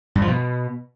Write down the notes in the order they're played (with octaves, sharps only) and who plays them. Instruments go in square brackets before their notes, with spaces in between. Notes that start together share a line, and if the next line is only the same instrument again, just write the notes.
[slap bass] G2
F3
B2